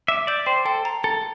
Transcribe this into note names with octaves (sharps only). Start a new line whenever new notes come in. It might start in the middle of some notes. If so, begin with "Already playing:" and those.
E5 D6
D5 G6
C5 G5
A4 G5
A#5
A4 A#5